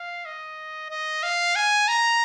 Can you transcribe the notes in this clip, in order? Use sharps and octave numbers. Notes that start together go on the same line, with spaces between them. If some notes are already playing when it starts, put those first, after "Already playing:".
Already playing: F5
D#5
D#5
F5
G#5
A#5